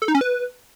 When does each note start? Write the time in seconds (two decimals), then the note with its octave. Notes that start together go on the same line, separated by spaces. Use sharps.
0.02 A4
0.08 D#4
0.15 C#4
0.21 B4